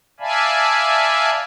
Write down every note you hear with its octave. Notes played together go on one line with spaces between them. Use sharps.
D5 E5 F5 G#5 A5 B5